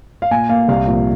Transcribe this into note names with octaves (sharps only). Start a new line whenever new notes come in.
F5
A#2 G#5
A#3 F5
C2 F5
A#2 F3 A#3